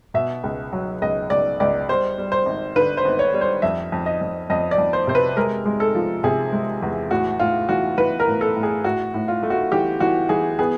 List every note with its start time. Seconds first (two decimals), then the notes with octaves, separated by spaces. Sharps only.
0.14 B2 E5
0.44 C#2
0.73 F#3
1.02 C#2 D#5
1.30 C#2 D5
1.60 C#2 D5
1.89 G3 C5
2.18 G3
2.32 C5
2.46 G#1
2.76 D3 B4
2.97 C5
3.05 G#1
3.19 C#5
3.34 G3
3.41 C5
3.62 F2 E5
3.92 F2
4.06 D#5
4.21 F2
4.50 F2 D#5
4.71 D5
4.78 F2
4.93 C5
5.07 C3 C5
5.15 B4
5.37 G#3 A#4
5.66 G#3
5.80 A4
5.95 F3
6.24 C3 G#4
6.52 G#3
6.82 E2
7.11 A2 F#4
7.39 A2 F4
7.69 E3 F#4
7.98 E3 B4
8.20 A#4
8.26 A2
8.41 A4
8.56 A2
8.63 G#4
8.84 A2 F#4
9.14 A2
9.28 F4
9.43 A3
9.50 F#4
9.72 E3 G4
10.00 E3 F#4
10.29 E3 G#4
10.59 B3 G#4